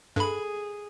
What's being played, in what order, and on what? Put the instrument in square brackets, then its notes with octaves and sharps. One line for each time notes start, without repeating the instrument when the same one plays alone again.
[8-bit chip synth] G2 B5 [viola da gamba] G#4 [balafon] A4